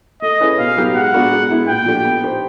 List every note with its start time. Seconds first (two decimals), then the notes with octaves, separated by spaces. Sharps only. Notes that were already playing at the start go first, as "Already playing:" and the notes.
0.22 A3 D#5
0.40 C#4 E4 G#4 B4
0.59 B2 F5
0.77 F#3 B3 D#4 G4
0.95 G#3 F#5
1.14 B3 D4 F#4 A#4
1.32 G#3
1.50 B3 E4
1.68 A#2 G5
1.86 F3 A3 D4 G4
2.05 B3
2.23 D#4 G4 C5